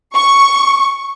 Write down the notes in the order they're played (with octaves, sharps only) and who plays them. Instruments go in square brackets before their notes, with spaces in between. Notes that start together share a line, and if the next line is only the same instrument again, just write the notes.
[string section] C#6